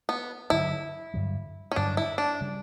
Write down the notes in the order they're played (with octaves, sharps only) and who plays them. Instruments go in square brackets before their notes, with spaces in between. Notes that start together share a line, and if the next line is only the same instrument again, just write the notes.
[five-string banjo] B3
[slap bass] G2 D3 F#3 [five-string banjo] E4
[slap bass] G2 D3 F#3
[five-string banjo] C#4
[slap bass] G2 D3 F#3 [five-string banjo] D4
[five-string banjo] E4
D4
[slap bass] C#3 G3